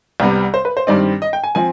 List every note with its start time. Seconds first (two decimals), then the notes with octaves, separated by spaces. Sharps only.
0.20 C2 C3 G3 B3
0.54 C5
0.65 B4
0.77 C5
0.87 G2 D#3 G3 C4 D5
1.22 D#5
1.33 G5
1.44 G#5
1.55 F3 C4 G#5